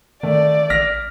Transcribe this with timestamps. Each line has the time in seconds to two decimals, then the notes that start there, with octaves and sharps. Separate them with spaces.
0.23 D#3 A3 D5
0.70 A1 F6 A#6 B6